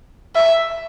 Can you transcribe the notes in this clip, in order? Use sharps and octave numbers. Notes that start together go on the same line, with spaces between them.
E5